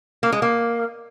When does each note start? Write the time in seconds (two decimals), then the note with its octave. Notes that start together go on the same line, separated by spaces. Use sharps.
0.23 A#3
0.32 G#3
0.42 A#3